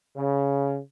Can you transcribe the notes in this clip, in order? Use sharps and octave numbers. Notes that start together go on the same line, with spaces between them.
C#3